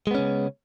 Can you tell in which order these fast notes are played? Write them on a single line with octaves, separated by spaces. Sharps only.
G#3 B3 C#4 C#3